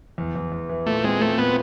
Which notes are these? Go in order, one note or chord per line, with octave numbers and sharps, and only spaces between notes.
E2
E2
E2
E3
A#2 A3
G#3 C4
A3 C4
A#2 B3